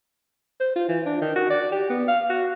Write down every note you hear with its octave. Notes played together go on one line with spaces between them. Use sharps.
C5
F4
E3
D4
D#3
F#4
D5
G4
B3
F5
F#4